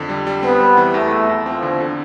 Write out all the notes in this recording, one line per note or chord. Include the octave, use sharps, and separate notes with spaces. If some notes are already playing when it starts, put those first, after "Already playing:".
Already playing: F2 D3
G3
G3
B3 C4
G3
E3
E2 A3
E2
E2
F3 C4
D3
D3